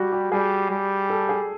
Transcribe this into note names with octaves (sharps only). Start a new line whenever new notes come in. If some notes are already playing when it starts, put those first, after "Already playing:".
Already playing: G3 F#4
G4
G3 G#4
G3
A4
G#4